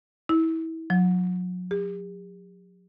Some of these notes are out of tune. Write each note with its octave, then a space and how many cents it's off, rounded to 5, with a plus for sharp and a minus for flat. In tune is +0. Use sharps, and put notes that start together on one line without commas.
E4 -25
F#3 -35
G4 +45